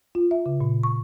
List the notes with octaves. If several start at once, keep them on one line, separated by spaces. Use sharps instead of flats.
F4
E5
C#3
A#2
C#6